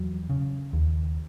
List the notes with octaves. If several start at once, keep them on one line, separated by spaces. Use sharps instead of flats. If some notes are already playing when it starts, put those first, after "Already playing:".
Already playing: E2 F#3
C#3
D#2